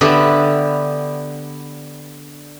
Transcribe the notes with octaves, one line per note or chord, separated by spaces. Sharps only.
D3 B3 G4 E5